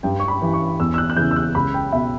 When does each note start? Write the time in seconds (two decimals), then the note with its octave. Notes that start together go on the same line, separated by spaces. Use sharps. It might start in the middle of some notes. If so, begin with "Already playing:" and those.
0.03 G2 G5
0.20 C#6
0.28 B5
0.42 E3
0.53 C#6
0.79 E2 E6
0.94 E6
0.98 F#6
1.10 F#6
1.16 C#3 E3 G6
1.31 E6
1.36 F#6
1.55 C#2 B5
1.74 G5
1.93 B2 E5